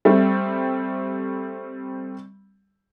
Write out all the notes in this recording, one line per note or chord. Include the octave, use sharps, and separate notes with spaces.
G3 A3 C4